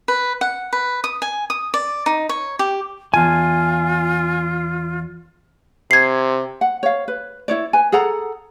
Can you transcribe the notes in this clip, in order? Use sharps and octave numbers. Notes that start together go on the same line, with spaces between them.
B4
F#5
B4
D#6
G#5
D#6
D5
D#4
C#5
G4
E2 F4 G#5 A5
C3 G#6 C7
F#5
C#5 F5
B4
E4 C#5 D5
B4 G#5
G#4 A4 F#5 A#5